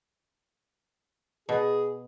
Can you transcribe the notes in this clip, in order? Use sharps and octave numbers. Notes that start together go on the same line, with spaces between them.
B2 G#4